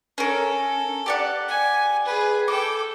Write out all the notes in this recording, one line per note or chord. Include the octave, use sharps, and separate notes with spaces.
C#4 A4 A#4
G4 D5 F#5
G#5
G#4 B4
A4 G5 D6